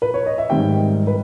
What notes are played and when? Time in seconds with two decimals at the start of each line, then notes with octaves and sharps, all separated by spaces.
0.02 B4
0.14 C#5
0.26 D#5
0.38 E5
0.50 G#2 D#3 G3 G5
1.07 B4